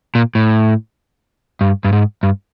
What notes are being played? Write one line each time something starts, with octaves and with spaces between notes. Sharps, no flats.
A#2
A2
G2
G2
G#2
G2